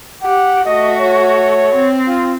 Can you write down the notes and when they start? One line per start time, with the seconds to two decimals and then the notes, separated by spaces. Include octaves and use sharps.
0.22 G4 F#5
0.65 A3 F#4 D#5
1.00 C#5
1.74 C4
2.07 F4